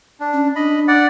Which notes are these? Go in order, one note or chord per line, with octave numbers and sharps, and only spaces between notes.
D4
C#4
D4 D#5 B5
D5 F#5